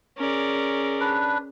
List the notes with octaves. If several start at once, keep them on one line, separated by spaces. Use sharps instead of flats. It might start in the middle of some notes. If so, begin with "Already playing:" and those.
C#4 G#4 A#4 D5
D4 B4